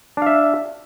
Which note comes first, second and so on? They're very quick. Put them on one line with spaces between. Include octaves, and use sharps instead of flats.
D4 F5 E5